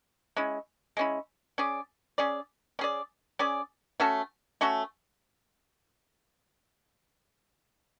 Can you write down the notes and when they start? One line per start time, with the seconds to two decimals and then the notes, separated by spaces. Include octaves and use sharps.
0.36 G#3 C#4 E4
0.97 G#3 C#4 E4
1.58 C#4 G#4 D5
2.18 C#4 G#4 D5
2.79 C#4 G#4 D5
3.39 C#4 G#4 D5
4.00 A3 C#4 F#4 A4
4.61 A3 C#4 F#4 A4